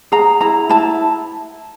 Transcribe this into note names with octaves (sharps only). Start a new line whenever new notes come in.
G#4 A#5
E4 A#5
E4 A5